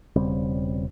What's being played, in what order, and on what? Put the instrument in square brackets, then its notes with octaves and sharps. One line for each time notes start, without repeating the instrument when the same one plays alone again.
[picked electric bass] E1 C#3 G3 C4